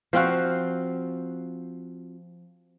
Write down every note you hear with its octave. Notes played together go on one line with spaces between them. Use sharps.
F3 C4 F4 F#4